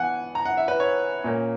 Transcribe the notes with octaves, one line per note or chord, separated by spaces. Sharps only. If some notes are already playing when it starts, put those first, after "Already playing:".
Already playing: E3 B3 F#5 G#5
A#5
F#5
E5
B4
C#5
A#2 A#3 C#4